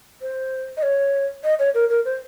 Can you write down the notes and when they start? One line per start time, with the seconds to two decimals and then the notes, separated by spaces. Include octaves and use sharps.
0.22 C5
0.77 D#5
0.83 C#5
1.44 D#5
1.59 C#5
1.75 A#4
1.90 A#4
2.05 C5